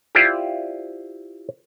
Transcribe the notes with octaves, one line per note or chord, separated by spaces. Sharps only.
E4 F4 G4 C5 D5